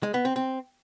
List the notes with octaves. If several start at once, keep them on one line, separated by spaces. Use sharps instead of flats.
G#3
B3
C4
C4